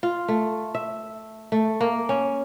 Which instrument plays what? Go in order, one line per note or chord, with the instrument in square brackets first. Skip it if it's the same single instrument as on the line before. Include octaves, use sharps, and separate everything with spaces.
[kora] F4
A3
E5
A3
A#3
C#4